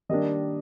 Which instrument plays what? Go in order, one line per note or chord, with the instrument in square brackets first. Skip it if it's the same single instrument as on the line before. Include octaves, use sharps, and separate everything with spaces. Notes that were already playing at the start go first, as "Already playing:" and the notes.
[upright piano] D#3 G3 A#3 D4 D#5